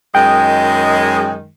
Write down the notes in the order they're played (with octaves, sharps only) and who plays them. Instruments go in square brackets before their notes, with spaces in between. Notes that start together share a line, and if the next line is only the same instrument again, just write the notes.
[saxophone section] F#2 D#3 G#3 [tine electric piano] G5